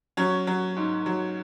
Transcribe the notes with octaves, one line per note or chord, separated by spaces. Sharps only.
F#3 C#4
F#3
G#2
F#3